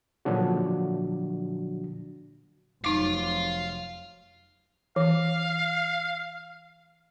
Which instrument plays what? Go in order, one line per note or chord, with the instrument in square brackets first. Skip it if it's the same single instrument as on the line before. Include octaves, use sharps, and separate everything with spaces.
[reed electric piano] A#2 D3 F3 F#3 D4 F#4
[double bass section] F1 F3 F#3 [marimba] D#4 D6 [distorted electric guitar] F5 C6
[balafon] E3 [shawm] F5